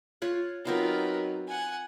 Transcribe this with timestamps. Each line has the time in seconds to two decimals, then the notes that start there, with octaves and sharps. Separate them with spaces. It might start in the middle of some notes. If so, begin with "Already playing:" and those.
0.22 F4 C#5 F#5
0.65 F#3 B3 C4 D#4 F4 A#4 C5
1.48 F#5 G#5